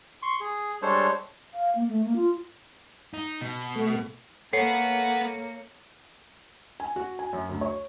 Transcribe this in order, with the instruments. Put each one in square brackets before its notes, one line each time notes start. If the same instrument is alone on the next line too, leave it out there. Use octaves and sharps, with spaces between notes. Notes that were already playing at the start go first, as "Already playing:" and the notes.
[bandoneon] C6 C#6
G#4
G3 G#3 D4 A4 C5 C#5
[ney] F5
A#3
A3
A#3
F4
[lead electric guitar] D#4
B2
[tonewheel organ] A3
[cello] A#3 [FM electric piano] A4 C#5 C#7 [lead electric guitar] B4 F#5 [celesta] C7
[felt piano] G#5
F#4
G#5
F#2
D2
C#5